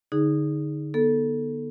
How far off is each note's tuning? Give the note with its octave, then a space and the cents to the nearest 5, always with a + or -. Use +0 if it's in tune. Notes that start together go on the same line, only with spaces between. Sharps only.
D3 +0 D#4 +0 G#4 +0
B3 -25 A4 +0